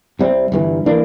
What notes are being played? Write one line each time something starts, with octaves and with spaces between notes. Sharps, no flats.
C2 C3 G3 C4
G1 G2 E3
E3 A#3 D4